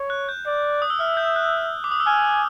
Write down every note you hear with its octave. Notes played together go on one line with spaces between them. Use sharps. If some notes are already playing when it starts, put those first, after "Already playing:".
Already playing: C#5
F#6
G6
D5
D#6
E6
E5 F6
G6
F#6
D6
D#6
E6
G#5 F6